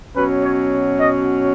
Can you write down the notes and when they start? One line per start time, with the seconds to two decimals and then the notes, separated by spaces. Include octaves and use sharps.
0.15 B2 F#3 C#4 B4
0.43 C#5
0.99 D#5